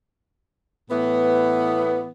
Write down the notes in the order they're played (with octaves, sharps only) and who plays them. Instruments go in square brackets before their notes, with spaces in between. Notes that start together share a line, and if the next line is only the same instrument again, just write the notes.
[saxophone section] A2 E3 B3